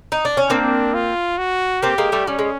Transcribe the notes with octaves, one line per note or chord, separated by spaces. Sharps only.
D#4
D4
C#4
A#3 C4 D4
F4
F#4
A#3 C4 G4
G#3 A#3
G3 A3
G3 C#4
G#3